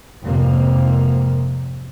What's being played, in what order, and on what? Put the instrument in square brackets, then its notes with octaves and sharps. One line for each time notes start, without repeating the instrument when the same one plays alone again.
[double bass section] F1 F2 G#2 C3 A#3